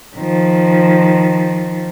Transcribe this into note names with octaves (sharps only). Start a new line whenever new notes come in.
D#3 F3